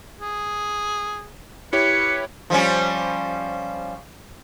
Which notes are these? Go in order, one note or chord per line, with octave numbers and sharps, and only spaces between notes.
G#4
E4 G4 B4 C#5 C#7
F3 G3 C#4